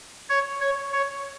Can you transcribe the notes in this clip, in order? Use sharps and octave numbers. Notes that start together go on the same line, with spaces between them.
C#5
C#5
C#5